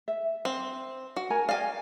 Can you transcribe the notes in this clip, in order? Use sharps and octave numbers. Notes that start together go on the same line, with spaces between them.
E5
C4
F#4
A#4 G#5 A#5
D5 D#5 F5 G5 G#5